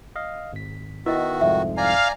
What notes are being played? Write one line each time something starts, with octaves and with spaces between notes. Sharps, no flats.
D#5 F5
G#1 B6
D#3 B3 E4 F#4 D#5 E5
C2 F2 G#2 E5
D5 F5 G#5 A#5